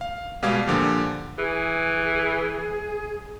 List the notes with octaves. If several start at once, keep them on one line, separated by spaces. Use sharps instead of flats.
F5
B2 G3 G#3 F5 D6 G#6
A#2 D3 F3 G4
E3 G#4